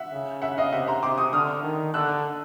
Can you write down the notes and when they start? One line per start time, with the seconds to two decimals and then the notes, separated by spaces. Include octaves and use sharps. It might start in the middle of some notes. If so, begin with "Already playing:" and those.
Already playing: E5 F#5
0.13 C#3
0.42 E5 F#5
0.58 D#5 F5
0.73 C3 E5 F#5
0.88 A#5 C6
1.03 C3 C6 D6
1.18 C#6 D#6
1.33 D3 D#6 F6
1.63 D#3
1.94 D3 E6 F#6